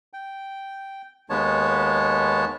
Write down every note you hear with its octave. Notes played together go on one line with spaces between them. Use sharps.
G5
D#2 G#3 B3 C#5 A5